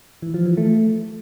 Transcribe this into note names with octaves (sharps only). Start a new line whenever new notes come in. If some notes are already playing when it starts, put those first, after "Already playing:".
E3
F3
E3
A3